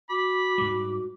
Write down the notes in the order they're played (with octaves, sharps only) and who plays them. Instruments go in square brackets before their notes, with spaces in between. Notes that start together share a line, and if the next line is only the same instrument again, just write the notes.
[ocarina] F#4 [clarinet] B5 [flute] D6
[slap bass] G#2 G3 [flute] D6